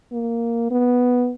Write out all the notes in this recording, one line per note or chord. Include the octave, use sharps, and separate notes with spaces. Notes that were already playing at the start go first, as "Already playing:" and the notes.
A#3
B3